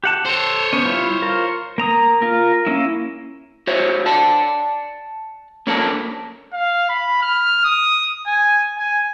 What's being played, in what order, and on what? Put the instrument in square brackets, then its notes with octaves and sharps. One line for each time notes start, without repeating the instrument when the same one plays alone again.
[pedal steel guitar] G4 F#5 A5
[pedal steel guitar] A4 [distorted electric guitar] C5 C#5
[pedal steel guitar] B3 C#4
G3 E4 F4
F4 A#4
A#3 A#5 D#6
F4 A#4
A#3 C#4 E4
[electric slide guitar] F#4 C5 C#5 E5
D5 F#5 A5
A#3 C#4 D4 A4 A#4
[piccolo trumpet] F5
B5
F6
D#6
G#5
G#5